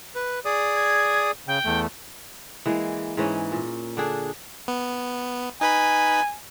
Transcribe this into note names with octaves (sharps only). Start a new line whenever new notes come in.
B4
G#4 D5 D#6
G#6
C#3 G5
E2 A3
E3 G#3 A#3
G#2 E3 C#4
A#2
D3 D4 G#4
B3
D#4 B4 G#5 B5